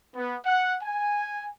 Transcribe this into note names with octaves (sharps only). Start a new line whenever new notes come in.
B3
F#5
G#5